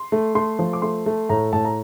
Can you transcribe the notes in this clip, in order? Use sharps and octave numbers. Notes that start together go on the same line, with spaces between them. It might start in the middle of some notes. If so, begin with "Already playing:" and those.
Already playing: C6
A3
A3 C6
F3
D6
A3 C6
A3
A2 A#5
A2 A5
A#5